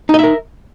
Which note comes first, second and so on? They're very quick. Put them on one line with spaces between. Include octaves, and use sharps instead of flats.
D#4 D#5 E5 A#4